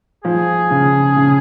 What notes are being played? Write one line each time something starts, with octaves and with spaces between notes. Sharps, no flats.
F3 G#4
C#3
C#3